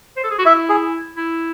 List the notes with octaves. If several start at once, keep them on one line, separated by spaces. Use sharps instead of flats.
C5
A4
G#4
F#4
E4 E5
G#4
E4